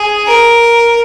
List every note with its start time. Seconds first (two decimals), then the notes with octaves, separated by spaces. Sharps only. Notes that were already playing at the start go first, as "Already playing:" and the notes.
Already playing: G#4
0.27 A#4